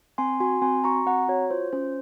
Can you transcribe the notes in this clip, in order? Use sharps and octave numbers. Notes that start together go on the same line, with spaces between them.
C4 G#5 C6
F#4 G#5 C6
C4 G#5 C6
F#4 A#5 C#6
C4 F#5 A#5
F#4 C#5
F4 C5
C#4 C5